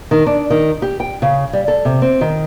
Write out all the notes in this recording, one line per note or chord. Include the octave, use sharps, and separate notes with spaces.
D#3
D4
D#3
G4
G5
C#3
G3
A4
C3
C4
D#3